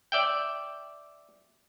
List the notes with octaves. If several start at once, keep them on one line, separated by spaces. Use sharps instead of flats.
D5 E5 G5